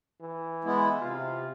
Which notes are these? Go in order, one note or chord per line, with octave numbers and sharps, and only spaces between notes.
E3
G#3 B3 E4
C3 F4